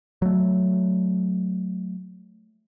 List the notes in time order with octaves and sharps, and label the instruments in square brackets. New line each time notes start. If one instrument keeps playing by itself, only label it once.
[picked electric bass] F#3 A3